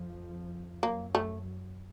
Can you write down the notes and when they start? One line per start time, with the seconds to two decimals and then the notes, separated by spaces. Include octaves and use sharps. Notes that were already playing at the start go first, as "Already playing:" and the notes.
Already playing: F2 F3
0.82 F#2 F#3 A#3
1.15 A3